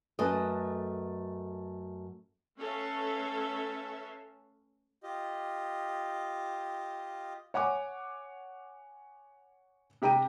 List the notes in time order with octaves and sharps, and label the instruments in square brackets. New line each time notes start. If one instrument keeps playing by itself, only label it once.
[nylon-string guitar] F#2 A3 B4 D#5
[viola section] A3 C#4 A4 B4 E5 F5
[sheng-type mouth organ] F4 G4 D#5
[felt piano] C#5 F#5 G#5 D6
C3 G4 G5 A#5 D#7